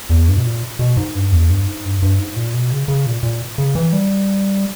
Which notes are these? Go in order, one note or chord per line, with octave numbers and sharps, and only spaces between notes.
E2
G2
B2
A#2
B2
G#2
G2
E2
G2
G#2
G2
G2
G#2
A#2
B2
C#3
C#3
A#2
A#2
C#3
E3
G3